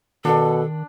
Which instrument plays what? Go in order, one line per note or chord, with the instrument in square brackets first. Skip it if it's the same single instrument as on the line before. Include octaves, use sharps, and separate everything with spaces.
[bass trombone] B2 [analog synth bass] D#3 [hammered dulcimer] D4 [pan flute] A4